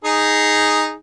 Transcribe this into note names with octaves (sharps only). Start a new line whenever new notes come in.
D#4 G#4